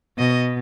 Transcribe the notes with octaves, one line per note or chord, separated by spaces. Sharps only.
B2 D#5